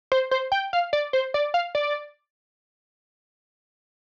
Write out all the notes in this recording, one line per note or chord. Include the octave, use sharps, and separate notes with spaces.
C5
C5
G5
F5
D5
C5
D5
F5
D5